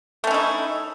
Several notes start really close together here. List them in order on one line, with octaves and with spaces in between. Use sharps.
A3 C#4 E4 D#4